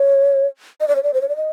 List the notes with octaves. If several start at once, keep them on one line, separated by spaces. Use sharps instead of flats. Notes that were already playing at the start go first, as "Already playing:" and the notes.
Already playing: C#5
D#5
D5
C#5
D5
C5
C#5
D5
D#5